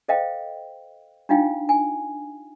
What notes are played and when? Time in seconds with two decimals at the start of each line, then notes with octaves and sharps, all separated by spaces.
0.08 A4 C5 D#5 F5 G5
1.29 D4 D#4 F4 F5 G5
1.69 G#5